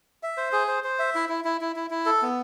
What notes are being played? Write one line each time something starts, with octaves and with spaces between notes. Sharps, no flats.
E5
C5
G#4
C5
C5
E5
E4
E4
E4
E4
E4
E4
A4
B3